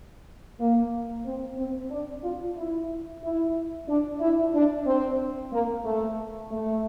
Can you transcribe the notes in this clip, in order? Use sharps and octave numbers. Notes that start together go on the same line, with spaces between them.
A#3
C4
C4
D4
F4
E4
E4
D4
E4
D4
C4
A#3
A3
A3